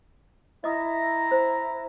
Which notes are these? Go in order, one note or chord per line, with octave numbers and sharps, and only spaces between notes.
E4 D#5 A#5 D#6
C5